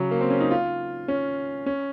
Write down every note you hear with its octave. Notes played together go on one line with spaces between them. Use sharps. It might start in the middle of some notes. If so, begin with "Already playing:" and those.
Already playing: C#3 F#3
A#3
C4
C#4
D#4
F4
C#4
C#4